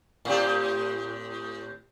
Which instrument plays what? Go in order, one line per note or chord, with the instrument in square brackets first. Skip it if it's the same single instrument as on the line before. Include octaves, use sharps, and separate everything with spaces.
[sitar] A2 C4 G4